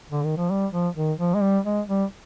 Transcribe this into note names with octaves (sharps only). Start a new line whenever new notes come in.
D3
D#3
F3
G3
F3
D#3
F3
G#3
G3
G#3
G3